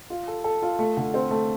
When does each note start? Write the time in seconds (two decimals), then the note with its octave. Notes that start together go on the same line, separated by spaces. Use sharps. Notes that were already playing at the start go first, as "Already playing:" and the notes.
0.10 F4
0.28 A4
0.44 A4
0.62 F4
0.79 A3
0.97 D3
1.14 C4
1.31 A3